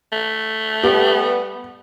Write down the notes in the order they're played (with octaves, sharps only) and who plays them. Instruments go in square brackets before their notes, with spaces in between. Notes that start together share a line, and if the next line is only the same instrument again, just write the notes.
[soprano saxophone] A3
[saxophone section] G3 B3 [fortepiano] G4